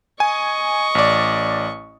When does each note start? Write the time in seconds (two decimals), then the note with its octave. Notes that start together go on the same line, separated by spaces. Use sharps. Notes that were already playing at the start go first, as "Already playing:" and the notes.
0.20 D#5 G#5 C#6
0.95 A1 D5